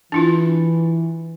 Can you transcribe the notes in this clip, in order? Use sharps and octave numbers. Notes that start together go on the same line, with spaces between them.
E3 D4 E4 F4